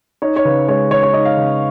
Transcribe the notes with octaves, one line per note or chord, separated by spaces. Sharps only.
D#4 C#5
C#5
C#3 B4
G#3 C#5
C#3 C#5
C#5
D#4 D#5
F5
C#3